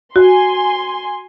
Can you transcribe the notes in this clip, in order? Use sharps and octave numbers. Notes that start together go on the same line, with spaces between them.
F#4 G#5 C6